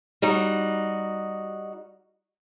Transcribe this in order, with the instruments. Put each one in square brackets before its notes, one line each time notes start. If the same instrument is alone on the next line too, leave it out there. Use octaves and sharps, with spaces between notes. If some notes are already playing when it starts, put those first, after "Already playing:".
[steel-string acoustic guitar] G3 D#4 F#4